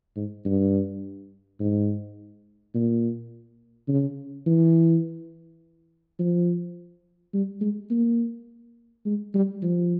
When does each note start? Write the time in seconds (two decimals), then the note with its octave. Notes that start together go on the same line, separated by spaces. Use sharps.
0.16 G#2
0.45 G2
1.60 G#2
2.75 A#2
3.88 C#3
4.47 E3
6.19 F3
7.34 G3
7.61 G#3
7.91 A#3
9.05 G#3
9.34 G3
9.63 F3